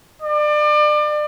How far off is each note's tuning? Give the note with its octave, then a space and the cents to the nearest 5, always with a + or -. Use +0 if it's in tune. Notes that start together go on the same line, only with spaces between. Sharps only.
D5 +30